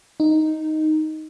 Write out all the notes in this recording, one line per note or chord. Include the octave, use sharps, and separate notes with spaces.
D#4